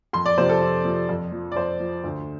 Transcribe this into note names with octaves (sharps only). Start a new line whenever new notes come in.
F2 C6
D5
C3 F3 C5
A4
F2
C3 F3
F2
F3
D5
F2 C5
F3
D2